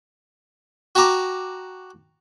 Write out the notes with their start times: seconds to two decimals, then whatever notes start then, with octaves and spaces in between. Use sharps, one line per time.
0.95 F#4 G5 A5 A#5 D6